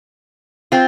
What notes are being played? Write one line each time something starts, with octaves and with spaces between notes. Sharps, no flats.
C4 F4